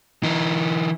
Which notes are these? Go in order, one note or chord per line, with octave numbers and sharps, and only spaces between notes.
E3 D#4